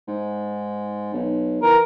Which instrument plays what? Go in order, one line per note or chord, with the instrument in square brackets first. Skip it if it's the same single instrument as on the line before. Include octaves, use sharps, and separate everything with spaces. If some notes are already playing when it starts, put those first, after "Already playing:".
[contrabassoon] G#2
B1
[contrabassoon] E3 [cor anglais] A#4